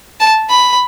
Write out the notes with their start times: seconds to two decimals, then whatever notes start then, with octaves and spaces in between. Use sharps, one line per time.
0.20 A5
0.49 B5